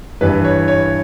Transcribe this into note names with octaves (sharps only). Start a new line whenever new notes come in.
G2 E3 B4
C#5
C#5